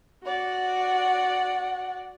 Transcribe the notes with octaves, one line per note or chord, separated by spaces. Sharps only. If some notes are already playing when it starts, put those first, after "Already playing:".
F#4 D5 F#5